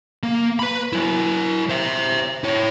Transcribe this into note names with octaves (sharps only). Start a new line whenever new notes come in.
A#3
B4 B5
F#3 E4
C5 E5
E4 C#5